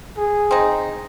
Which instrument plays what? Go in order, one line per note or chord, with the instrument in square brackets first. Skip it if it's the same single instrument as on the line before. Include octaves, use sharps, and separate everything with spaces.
[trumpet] G#4
[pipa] C4 D#4